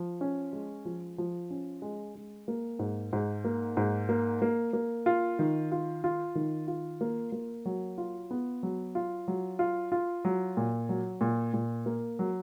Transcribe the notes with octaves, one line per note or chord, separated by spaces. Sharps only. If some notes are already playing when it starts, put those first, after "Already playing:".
Already playing: F3
C#4
G#3
F3
F3
C#4
G#3
G#3
A#3
G#2
G#2
A#3
G#2
A#3
A#3
A#3
F4
D#3
F4
F4
D#3
F4
A#3
A#3
F#3
F4
B3
F#3
F4
F#3
F4
F4
F#3
A#2
F#3
A#2
A#2
A#3
F#3